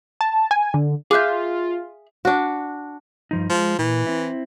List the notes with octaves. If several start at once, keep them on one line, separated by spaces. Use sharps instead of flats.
A5
G#5
D3
F4 G#4 E5 D6 F#6 G6
D4 F#4
G2 F3 D#4
F3 G#3
A#2 E3
C4 E4